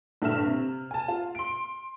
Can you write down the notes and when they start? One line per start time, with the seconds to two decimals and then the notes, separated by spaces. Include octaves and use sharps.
0.22 A#1 G2 D3 E5 F6 E7
0.46 C3
0.91 G#5 A5
1.08 F4
1.35 C6 D7